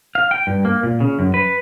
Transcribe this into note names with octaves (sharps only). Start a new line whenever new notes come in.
F5
G5
G2
A#3
A#2
C#3
F#2
B4